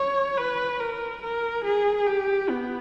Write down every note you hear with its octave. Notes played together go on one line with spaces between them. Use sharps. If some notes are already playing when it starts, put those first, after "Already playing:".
Already playing: C#5
B4
A#4
A#4
G#4
G4
B3